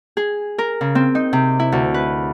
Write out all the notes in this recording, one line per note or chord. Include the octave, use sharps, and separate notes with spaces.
G#4
A#4
C#3
C4
D#4
C3
E4
D2
B4